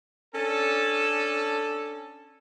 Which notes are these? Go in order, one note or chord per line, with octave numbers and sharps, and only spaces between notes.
C#4 D4 A4